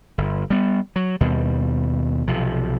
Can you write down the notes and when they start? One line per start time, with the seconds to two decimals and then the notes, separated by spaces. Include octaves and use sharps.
0.18 G1
0.50 G3 B3
0.96 F#3
1.21 D#2 B2 G3
2.28 B1 C3 F3